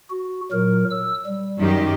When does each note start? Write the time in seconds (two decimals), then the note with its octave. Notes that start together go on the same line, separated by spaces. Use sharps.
0.10 F#4
0.52 A#2 F#3 A#4
0.90 E6
1.27 G3
1.60 F#2 D#3 G4